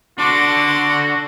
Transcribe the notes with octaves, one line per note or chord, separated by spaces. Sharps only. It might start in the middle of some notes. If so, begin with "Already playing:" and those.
D3 F#4 A4 C6 D6